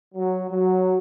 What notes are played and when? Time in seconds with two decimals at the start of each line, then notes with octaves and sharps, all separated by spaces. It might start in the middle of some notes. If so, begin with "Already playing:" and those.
0.15 F#3
0.49 F#3